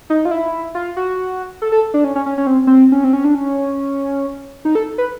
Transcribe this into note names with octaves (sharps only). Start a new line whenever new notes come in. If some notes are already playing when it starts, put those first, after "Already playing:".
D#4
F4
E4
F4
F#4
A4
A4
D4
C#4
C#4
C#4
C#4
C4
C4
C#4
C4
C#4
D4
C#4
D#4
A4
B4